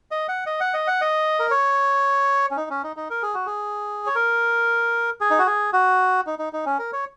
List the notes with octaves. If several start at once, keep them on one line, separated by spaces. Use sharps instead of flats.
D#5
F#5
D#5
F#5
D#5
F#5
D#5
A#4
C#5
C#4
D#4
C#4
D#4
D#4
A#4
G#4
F#4
G#4
C#5
A#4
G#4
D#4
F#4
G#4
F#4
D#4
D#4
D#4
C#4
A#4
C#5